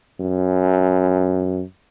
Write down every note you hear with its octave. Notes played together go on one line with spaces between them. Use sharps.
F#2